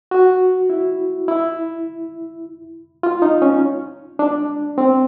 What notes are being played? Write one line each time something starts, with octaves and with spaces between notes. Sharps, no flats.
F#4
E4
E4
F4
D#4
C#4
D4
C4